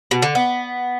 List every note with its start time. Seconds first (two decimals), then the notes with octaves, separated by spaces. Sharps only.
0.11 B2
0.22 D3
0.35 B3